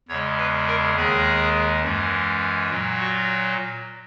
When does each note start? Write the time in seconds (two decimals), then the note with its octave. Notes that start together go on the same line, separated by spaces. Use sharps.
0.08 E2 C#3 G#3 C#5
0.38 B4
0.67 A#4
0.96 D#2 D#3 G#3 G#4
1.83 F#2 E3 G#3
2.70 A#2 F#3
3.00 F#4